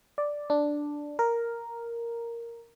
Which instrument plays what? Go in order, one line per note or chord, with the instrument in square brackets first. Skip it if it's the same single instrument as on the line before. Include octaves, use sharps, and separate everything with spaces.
[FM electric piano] D5
D4
A#4